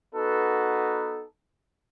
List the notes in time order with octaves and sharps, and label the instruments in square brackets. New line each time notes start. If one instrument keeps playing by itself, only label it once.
[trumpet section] B3 D#4 F#4 A4 B4